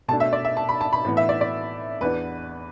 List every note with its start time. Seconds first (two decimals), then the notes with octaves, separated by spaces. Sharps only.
0.08 B2 A3 D4 A5
0.20 E5
0.33 D5
0.45 E5
0.57 A5
0.69 B5
0.81 A5
0.93 B5
1.05 A2 E3 B3
1.17 E5
1.29 D5
1.41 D5
2.01 E2 E3 B3 D4 B4